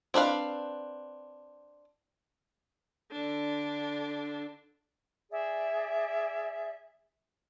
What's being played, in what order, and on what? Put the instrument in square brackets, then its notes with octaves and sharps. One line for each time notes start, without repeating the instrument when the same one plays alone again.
[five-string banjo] C4 D4 B4 F5
[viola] D3 D4
[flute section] G#4 D5 E5